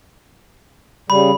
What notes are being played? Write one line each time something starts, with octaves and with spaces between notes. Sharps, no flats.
C#3 G3 B5